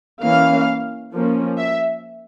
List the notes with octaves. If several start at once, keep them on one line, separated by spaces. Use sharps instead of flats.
E3 A#3 C#4 F5
F3 A#3 C#4
E5